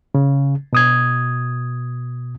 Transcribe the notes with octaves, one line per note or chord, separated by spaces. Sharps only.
C#3
B2 D#6 G#6